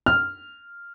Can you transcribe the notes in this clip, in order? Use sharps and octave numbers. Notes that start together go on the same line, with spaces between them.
F6